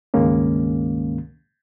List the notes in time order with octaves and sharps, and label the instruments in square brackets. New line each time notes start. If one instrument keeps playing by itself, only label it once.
[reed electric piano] C#2 G2 D#3 G#3 A#3 C#4